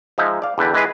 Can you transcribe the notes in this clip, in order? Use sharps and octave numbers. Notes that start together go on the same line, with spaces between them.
F3 G#3 D#4 E5
D5 F5
E2 D3 B4 G5
E3 G#3 G#4 B4